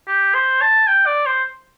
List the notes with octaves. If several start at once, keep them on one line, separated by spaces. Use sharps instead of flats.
G4
C5
A5
G5
D5
C5